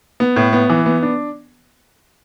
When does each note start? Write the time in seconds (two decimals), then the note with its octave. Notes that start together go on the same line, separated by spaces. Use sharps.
0.20 B3
0.36 A2
0.53 B3
0.70 E3
0.86 B3
1.03 D4